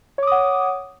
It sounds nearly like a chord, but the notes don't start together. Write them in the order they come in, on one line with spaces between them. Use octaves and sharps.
C#5 D6 D#6 F#5